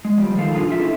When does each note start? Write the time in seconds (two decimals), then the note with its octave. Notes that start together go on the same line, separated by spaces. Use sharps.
0.05 G#3
0.18 F3 G3
0.36 D#3 F3 A4 F5
0.54 F#2 A#2 D4 F4 G#4 A#5
0.68 F4 A4 E5
0.79 C#4 E4 A4